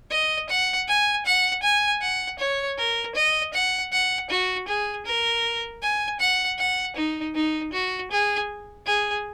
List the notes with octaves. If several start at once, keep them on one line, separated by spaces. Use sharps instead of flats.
D#5
F#5
G#5
F#5
G#5
F#5
C#5
A#4
D#5
F#5
F#5
F#4
G#4
A#4
G#5
F#5
F#5
D#4
D#4
F#4
G#4
G#4